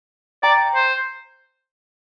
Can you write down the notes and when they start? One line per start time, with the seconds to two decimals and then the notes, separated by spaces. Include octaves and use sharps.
0.43 D5 G5 A#5
0.75 C5